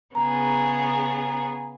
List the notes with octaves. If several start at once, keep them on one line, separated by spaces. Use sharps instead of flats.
C#3 B3 G#4 A#5